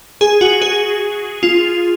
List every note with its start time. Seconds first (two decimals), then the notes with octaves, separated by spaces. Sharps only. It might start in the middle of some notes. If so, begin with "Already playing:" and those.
0.21 G#4
0.41 F#4
0.62 G#4
1.43 F4